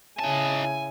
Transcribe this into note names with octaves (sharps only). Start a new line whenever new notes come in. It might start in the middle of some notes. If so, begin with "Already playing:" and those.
C#3 D#4 E4 G#5 A5